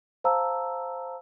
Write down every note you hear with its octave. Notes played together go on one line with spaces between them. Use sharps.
C5 F5 A5 A#5 E6